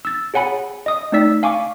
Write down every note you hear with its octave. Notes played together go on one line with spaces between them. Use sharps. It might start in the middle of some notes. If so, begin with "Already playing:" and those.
E6 A6
G#4 C#5 F#5 G#5 B5
D#5 D#6
A3 C4 D#4 D5 E6 B6
F5 G#5 C#6 D6